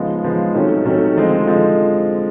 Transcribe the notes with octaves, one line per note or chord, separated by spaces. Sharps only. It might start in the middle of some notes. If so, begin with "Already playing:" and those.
Already playing: C#3 F3 G#3 B3 D#4
C#3 F3 G#3 B3 D#4
C3 D#3 F#3 A3 C#4
C3 D#3 F#3 A3 C#4
D3 F3 G#3 C4 D#4
D3 F3 G#3 C4 D#4